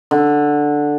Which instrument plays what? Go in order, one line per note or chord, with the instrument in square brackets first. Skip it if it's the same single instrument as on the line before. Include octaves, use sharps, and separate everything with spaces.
[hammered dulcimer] D3